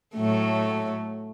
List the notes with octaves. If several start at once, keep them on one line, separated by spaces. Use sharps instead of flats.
A2 F#3 A3